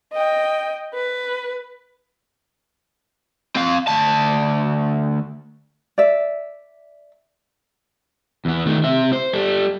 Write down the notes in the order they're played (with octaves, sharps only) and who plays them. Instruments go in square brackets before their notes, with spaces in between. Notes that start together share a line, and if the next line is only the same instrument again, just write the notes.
[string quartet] D#5 G5
B4
[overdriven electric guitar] C4 F5
D2 A5
[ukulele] D5 E5
[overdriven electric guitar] E2 B3
D#3 A3
C3 E5
C5
G3 A4